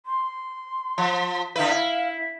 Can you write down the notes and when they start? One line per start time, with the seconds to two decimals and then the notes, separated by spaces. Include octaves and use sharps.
0.06 C6
0.98 F3
1.56 D3 E4 B4 F5
1.70 E4